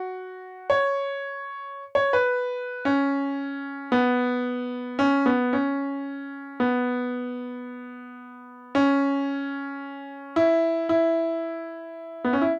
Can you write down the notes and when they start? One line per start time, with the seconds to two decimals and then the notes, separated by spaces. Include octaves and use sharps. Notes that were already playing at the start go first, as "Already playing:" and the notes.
Already playing: F#4
0.70 C#5
1.95 C#5
2.13 B4
2.85 C#4
3.92 B3
4.99 C#4
5.26 B3
5.53 C#4
6.60 B3
8.75 C#4
10.36 E4
10.89 E4
12.24 B3
12.33 C#4
12.41 E4